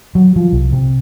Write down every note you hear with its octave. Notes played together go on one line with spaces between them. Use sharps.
F#3
F3
C2
C3